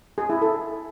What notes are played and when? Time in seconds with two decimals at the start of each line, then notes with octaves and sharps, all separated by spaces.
0.18 G#4
0.30 E4
0.42 A4